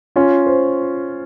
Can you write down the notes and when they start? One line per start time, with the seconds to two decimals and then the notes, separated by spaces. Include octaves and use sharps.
0.16 C#4 F4
0.46 C5